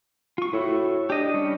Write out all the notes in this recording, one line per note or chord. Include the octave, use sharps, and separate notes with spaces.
F4 C#6
A2 E4 F#4 A4
D4 G4 D#5
G3 C#4